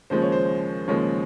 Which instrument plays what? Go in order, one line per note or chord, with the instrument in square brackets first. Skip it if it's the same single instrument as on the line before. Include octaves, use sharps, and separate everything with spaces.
[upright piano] D#2 C#3 F3 G#3 C5
C#5
C5
D#2 C#3 F3 G#3 C#5